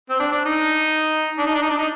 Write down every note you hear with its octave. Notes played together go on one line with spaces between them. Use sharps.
C4
D4
D4
D#4
D4
D#4
D4
D#4
D4
D#4